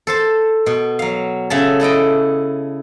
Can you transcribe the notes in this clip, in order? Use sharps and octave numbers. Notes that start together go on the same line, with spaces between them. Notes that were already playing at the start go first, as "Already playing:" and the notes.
A4 C5 A5
B2
F#3 F5
C#3 A4 E5 A5
E4 A4 D#5 G5